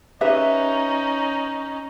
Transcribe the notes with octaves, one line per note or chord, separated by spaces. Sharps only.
C#4 D#4 G4 B4 E5